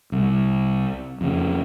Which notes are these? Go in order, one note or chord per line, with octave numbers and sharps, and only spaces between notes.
C2
F2 C#3